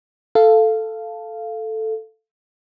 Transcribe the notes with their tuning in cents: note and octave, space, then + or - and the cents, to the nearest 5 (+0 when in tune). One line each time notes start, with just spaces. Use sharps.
A4 +0 F5 -10